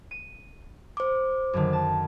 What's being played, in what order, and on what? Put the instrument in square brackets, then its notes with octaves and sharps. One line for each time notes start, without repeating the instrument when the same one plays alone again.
[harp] D#7
[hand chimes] C5 D6
[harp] F#2 D3 D#3
A5